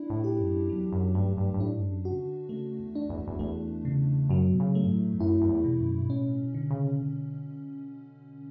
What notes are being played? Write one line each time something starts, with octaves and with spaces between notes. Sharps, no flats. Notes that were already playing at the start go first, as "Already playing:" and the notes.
Already playing: D4 E4
A2
G4
F#2
E2 F#3
F#2
G2 A3
G2
G2
A2 D4
G2
F#2
F#4
C#3
D3
C#3 A3
E2
D4
E2
E2
E2 A3
C#3
F#2 F#3
B2
C#3
A3
G2
A2
E2
F#2 E4
F#2
E2
B2
F#2
G2
A2 C#4
D3
C#3